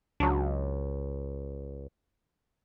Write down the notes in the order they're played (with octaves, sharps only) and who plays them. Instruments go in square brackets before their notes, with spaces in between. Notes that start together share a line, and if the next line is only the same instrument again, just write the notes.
[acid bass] C#2 [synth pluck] F#3 D4